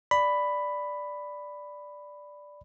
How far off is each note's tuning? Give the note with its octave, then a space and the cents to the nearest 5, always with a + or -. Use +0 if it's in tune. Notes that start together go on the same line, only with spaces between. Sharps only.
D5 +0 B5 +5